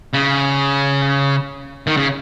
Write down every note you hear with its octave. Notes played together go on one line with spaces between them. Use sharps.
C#3
D#3
C#3